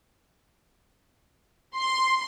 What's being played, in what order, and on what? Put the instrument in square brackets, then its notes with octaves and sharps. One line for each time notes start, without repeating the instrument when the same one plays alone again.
[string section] C6